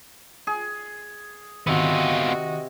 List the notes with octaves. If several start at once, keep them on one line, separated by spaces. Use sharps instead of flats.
G#4
C3 D#3 B3 F4 F#4 D#5